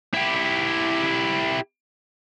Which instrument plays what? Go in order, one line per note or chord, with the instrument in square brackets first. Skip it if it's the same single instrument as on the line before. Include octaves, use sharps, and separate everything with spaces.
[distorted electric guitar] E4 G4